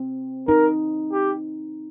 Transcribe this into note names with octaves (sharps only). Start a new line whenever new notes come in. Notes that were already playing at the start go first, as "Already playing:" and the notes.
Already playing: C4
D#4 A#4
G4